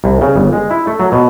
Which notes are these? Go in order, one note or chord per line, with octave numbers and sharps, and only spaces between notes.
C2
C#3
G1
G#3
E4
A3
F#3
B2